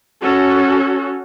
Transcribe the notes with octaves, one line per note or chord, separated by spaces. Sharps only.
C#4 F#4 A4